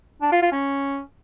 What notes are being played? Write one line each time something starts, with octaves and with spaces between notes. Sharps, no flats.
D4
F4
F4
C#4